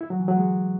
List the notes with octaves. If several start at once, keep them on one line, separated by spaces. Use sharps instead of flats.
E4
F#3
E3
F#3
G#3